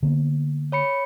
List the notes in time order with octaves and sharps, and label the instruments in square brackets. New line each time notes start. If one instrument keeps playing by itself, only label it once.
[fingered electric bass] D3 A#3 B3
[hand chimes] C#5 B5 C#7